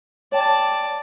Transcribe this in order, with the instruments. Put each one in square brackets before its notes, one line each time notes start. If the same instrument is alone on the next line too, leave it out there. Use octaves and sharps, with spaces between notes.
[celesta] C#5 G5 [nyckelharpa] D5 A5